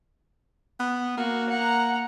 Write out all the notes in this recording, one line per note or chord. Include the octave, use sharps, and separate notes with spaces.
B3
A#3 F#4
F#5 A#5